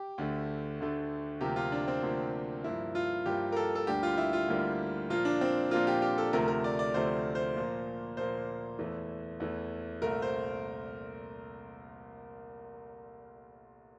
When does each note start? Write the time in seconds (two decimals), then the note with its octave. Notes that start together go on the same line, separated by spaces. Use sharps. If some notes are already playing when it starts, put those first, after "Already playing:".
Already playing: G4
0.18 D2 D3 A3
0.80 D2 D3 A3
1.41 D2 C3 F3 A#3 G4
1.56 F4
1.72 D4
1.88 C4
2.03 D2 C3 F3 A#3
2.64 G2 F3 A#3 E4
2.95 F4
3.26 G2 F3 A#3 G4
3.52 A#4
3.56 A4
3.75 A4
3.87 D2 D3 G3 A#3 G4
4.03 F4
4.18 E4
4.33 F4
4.48 D2 D3 G3 A#3
5.10 A#2 F3 A#3 F4
5.25 D4
5.41 C4
5.71 A#2 F3 A#3 F4
5.87 G4
6.02 G4
6.18 A4
6.33 D2 C3 F3 A3 A#4
6.48 A#4
6.64 D5
6.79 D5
6.94 D2 C3 F3 A3 C5
7.35 C5
7.56 A#2 F3 A#3
8.17 A#2 F3 A#3 C5
8.79 E2 E3 A3
9.40 E2 E3 A3
10.02 C2 A#2 A3 A#4
10.22 C5